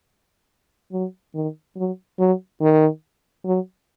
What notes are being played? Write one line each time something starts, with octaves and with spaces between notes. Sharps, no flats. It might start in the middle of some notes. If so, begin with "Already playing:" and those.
F#3
D#3
F#3
F#3
D#3
F#3